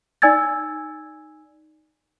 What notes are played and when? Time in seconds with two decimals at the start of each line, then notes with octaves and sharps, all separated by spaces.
0.22 D#4 D5 G#5 E6 G#6 A6